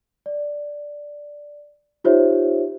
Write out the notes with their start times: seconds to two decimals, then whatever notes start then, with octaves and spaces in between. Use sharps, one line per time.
0.26 D5
2.04 D#4 F4 G4 C5 C#5 E5